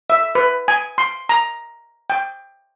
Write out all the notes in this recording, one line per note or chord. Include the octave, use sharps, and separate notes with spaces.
E5
B4
G#5
C6
A#5
G5